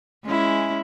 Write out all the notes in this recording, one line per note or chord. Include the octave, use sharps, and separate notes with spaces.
G#3 C#4 E4